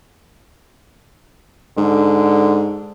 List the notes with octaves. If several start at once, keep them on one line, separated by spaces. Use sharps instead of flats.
G#2 D3